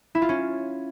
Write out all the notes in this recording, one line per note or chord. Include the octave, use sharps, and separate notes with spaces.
E4
F4
C#4